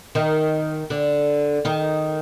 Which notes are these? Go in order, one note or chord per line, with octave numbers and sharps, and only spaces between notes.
D#3 D#4
D3 D4
D#3 D#4